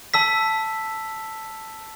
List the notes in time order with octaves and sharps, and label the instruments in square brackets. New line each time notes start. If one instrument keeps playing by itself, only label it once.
[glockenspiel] A5 E6 B6